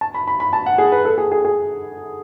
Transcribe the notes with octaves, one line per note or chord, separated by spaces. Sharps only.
A5
B5
B5
B5
A5
F#5
G#4
B4
A4
G#4
G#4
G#4